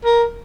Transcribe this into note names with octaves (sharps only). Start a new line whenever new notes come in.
A#4